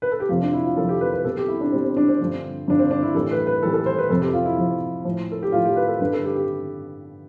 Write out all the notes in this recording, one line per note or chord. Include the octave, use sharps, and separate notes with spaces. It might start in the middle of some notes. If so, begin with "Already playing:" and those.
B4
A4
G4
F2 C3 F3 F4
D4
E4
F4
F2 C3 F3 A4
G4
B4
B4
B2 G3 A4
G4
E4
D4
B2 G3 C4
C4
D4
C4
G2 D3 F3
G2 D3 F3 D4
C4
D4
E4
A2 E3 G3 A4
B4
B4
A2 E3 G3 A4
A4
C5
B4
F2 C3 F3 A4
G4
F4
E4
F2 C3 F3
A2 F3
A4
G4
A2 F3 F4
G4
B4
A4
G2 D3 G3 B4
A4
G4
G4